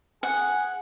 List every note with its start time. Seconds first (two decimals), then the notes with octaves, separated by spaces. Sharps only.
0.23 G#4 F#5